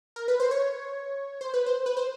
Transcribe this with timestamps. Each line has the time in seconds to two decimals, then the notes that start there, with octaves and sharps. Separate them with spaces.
0.16 A#4
0.28 B4
0.40 C5
0.51 C#5
1.41 C5
1.54 B4
1.66 C5
1.86 B4
1.97 C5